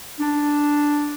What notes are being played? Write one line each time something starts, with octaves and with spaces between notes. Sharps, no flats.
D4